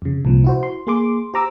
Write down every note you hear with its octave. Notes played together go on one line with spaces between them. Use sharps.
F2 C#3
C2 A#2 F3
E4 F#4 C5
C6
A#3 G#4 C6 D6
G4 C5 A#5 D6 E6